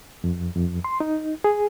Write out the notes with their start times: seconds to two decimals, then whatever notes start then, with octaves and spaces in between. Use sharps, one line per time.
0.24 F2
0.56 F2
0.84 C6
1.00 D#4
1.44 G#4